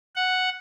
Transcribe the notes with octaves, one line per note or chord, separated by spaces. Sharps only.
F#5